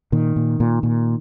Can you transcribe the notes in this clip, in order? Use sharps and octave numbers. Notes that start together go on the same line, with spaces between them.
A#2 D#3
A#2
A#2
A#2